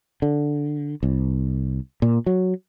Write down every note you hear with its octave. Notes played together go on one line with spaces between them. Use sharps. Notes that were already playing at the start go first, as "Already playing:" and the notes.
D3
C2
A#2
F#3